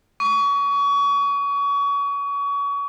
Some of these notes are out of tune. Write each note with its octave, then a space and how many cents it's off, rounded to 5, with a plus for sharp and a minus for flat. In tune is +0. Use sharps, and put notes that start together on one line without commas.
C#6 +30